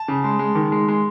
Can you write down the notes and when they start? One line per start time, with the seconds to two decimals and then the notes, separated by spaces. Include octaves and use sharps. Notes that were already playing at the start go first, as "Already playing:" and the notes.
Already playing: A5
0.08 C#3
0.24 G#3
0.39 G#3
0.55 D#3
0.72 G#3
0.88 G#3